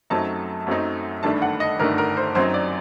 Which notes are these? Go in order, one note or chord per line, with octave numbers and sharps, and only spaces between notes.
F#2 F#3 A3 C4 D#4 A5
F#2 F#3 A3 C4 D#4
G1 G2 D#3 A3 D4 A5
F#5
D#5
G1 G2 D#3 A3 D4 A#4
A#4
C5
F#2 F#3 C4 D#4 C5
D5